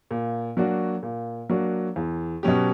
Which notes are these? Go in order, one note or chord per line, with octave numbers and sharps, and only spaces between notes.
A#2
F#3 A#3 D4 F#4
A#2
F#3 A#3 D4 F#4
E2
B2 F#3 C#4 G4